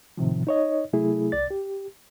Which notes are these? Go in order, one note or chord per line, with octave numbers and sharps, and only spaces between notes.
A2 C3 D#3 F3
D#4 C#5 D#5
C3 F#3 A3 E4 G#4
C2 D5 A6
G4